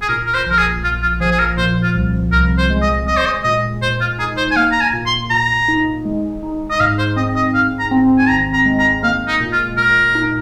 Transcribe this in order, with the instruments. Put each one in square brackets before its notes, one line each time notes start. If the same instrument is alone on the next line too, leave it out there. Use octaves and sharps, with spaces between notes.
[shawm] G#4
[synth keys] A#2 [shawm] A#4
[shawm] A#4
C5
[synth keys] A#1 [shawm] A#4
[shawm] G#4
[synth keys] A#1 [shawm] F4
[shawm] F4
[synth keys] F3 [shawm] G#4
[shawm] G#4
A#4
[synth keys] A#2 [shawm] C5
[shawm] F4
[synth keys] C2
[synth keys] C2 [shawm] A#4
[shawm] C5
[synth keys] G#3
[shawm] D#5
[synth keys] G#3 [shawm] D#5
[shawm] C5
D#5
[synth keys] A#2 [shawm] D#5
[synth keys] A#2 [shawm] C5
[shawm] F4
[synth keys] D#4 [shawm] G#4
[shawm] C5
G#5
[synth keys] A#3 [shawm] F5
[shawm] A#5
G#5
[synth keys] A#2
[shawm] C6
[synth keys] A#2 [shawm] A#5
[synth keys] D#4
G#3
D#4
[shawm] D#5
[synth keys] G#2 [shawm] F5
[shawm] C5
[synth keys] C4 [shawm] D#5
[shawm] D#5
[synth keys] G#2 [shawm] F5
[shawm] A#5
[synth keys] C4
[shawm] G#5
[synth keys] G#1 [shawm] A#5
[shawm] A#5
[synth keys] G#3
[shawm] A#5
[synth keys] A#3 [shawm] F5
[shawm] D#4
[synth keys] A#2
[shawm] F4
[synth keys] A#2 [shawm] A#4
[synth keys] D#4